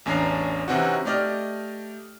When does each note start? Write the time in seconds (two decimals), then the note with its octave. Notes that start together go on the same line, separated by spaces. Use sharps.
0.06 A1 E2 C#4 D4 A#5 C7
0.68 C3 E3 C4 C#4 D#4 F#4
1.05 A3 G4 D5 D#5 F6